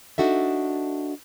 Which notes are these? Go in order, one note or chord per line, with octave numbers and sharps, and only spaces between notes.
D4 D#4 F#4 A4 E5